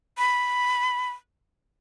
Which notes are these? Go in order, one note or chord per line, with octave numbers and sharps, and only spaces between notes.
B5